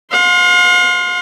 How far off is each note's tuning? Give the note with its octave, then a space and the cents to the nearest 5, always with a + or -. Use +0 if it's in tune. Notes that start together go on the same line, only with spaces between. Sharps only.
F5 +40 C6 +0